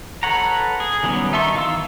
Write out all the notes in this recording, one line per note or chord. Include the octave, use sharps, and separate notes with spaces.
A4 B4 C#5 F#5 A#5
G#4
D#3 F#3 G3 B3 C#4
D#4 E5 A5 C6 C#6
D#3 E3 F5 C6 E6